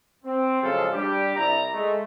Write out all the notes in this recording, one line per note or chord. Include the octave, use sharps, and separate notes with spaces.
C4
C#3 F3 F#3 G#3 F4 A4
G3 D4 G4
C2 E4 D5 A#5
G#3 A3